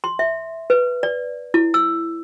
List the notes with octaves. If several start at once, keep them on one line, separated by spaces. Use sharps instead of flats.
C6
E5
B4
D5
E4
E6